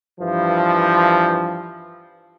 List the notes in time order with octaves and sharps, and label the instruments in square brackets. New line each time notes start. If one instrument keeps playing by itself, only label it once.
[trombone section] G2 E3 F3